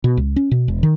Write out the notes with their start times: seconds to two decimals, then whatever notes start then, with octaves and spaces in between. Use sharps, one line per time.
0.04 B2
0.17 C#2
0.36 C#4
0.51 B2
0.68 E1
0.83 D#3